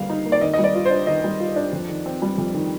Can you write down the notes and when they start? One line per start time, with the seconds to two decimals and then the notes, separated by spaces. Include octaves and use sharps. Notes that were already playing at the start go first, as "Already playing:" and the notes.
Already playing: D3 G3 A#3 F5
0.09 D#4
0.26 A#3
0.32 D5
0.41 D#3 D#5
0.53 G3 D#5
0.64 D5
0.75 F4
0.85 C5
0.90 D4
1.07 D#3 D#5
1.24 G3
1.40 F4
1.56 D4
1.73 F2
1.89 D#3
2.06 C4
2.22 G3
2.38 F2
2.54 D#3